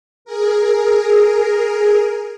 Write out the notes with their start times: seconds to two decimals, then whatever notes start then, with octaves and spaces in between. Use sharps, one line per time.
0.25 G#4 A#4